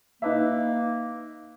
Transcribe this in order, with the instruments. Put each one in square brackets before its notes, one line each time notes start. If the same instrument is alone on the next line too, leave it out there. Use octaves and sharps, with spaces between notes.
[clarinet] A#3 [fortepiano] D#4 B4 E5